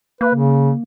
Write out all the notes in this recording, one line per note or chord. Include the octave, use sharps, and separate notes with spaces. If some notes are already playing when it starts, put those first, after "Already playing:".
A#3 B4
C#3